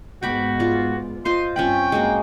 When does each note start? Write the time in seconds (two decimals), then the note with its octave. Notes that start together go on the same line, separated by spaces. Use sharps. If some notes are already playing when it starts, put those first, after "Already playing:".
0.23 G#2 G#3 B3 F#4 G5 B5 D6
0.59 F4 D5
1.25 F4 C5 D#5 C6
1.56 G2 C4 C#4 F4 G5 B5
1.92 G#3 A#3 F#4